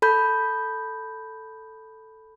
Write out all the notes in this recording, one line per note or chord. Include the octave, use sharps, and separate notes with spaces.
A4 B5 G6